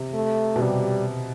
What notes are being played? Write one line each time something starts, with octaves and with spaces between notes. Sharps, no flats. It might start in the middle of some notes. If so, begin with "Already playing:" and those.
Already playing: C3
A3
B2
C3 G3